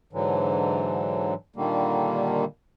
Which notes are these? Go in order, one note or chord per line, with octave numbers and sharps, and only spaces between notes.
G#2 D3 E3 F#3
A#2 D3 D#3 G3 A#3